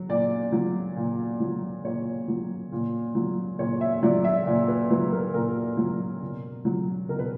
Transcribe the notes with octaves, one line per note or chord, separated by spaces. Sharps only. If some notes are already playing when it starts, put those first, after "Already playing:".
Already playing: F#3
A#2 D5
F#3
A#2
F#3
A#2 C#5
F#3
A#2
F#3
A#2 C#5
E5
F#3 D5
E5
A#2 D5
B4
F#3 B4
A#4
A#2 A#4
F#3
B2
F#3
B2 A#4
B4